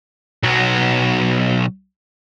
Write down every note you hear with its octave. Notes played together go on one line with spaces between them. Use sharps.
B1 F#3